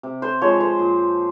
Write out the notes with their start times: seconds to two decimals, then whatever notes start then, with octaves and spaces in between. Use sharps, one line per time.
0.03 C3
0.22 C5
0.41 F3 G#3 C#5
0.60 C5
0.79 A#2